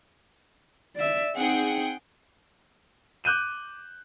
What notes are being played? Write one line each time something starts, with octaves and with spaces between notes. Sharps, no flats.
D5 E5
C4 D#4 G#4 F#5 G5
D6 F#6 G6 D#7 E7